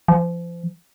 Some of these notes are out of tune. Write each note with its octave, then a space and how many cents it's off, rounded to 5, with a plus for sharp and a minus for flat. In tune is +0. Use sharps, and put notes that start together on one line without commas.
F3 -35